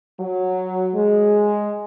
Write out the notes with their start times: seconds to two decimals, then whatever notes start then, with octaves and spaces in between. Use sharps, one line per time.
0.19 F#3
0.95 G#3